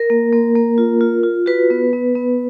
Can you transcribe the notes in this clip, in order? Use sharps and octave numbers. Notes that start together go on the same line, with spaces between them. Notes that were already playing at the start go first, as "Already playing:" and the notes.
Already playing: A#4
A#3
A#3
A#3
F4
F4
F4
F#4 B4
B3
B3
B3